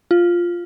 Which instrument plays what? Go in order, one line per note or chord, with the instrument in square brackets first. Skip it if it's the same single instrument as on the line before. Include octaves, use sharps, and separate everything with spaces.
[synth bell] F4